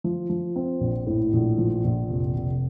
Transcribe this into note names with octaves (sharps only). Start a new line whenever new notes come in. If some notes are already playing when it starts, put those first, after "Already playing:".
F3
F3
C4
A#1
A2
A#1
F3
A#1
F1
F1